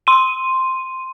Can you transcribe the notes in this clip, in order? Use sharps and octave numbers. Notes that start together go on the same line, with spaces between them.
C6 D#7